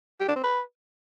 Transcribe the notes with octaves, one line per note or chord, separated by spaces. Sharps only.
G4
D4
C4
B4